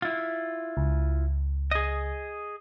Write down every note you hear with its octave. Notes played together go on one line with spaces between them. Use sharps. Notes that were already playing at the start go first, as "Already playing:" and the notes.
E4 F4
C#2
G#4 D#5